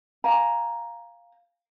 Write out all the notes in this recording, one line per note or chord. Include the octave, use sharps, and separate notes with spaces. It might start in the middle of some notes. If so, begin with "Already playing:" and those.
F5 G#5 A#5